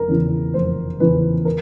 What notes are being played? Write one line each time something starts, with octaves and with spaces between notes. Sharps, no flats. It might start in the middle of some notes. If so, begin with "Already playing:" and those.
Already playing: F1 A#4
E2 C#3 E3
F1 C5
E2 C#3 E3 B4
A#4